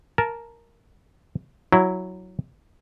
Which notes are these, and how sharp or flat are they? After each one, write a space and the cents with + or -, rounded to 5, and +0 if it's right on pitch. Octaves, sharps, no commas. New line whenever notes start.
A#4 +0 A5 -15
F#3 +0 E4 +0